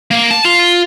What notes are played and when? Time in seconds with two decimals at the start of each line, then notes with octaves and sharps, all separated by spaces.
0.11 A#3
0.31 A5
0.45 F4